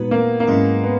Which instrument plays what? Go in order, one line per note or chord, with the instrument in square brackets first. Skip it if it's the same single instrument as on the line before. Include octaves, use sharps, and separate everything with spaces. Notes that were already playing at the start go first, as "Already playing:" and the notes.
Already playing: [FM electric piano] A#2 G#3 D#4 F#4 [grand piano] B3
[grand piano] A#3
A#3
[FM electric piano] G#2 F#3 C#4 E4 [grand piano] G#3
[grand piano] B3